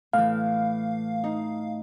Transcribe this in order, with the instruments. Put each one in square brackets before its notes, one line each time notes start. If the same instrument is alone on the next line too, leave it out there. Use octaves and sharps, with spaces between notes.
[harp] A2 E3 [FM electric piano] F5
[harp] D#4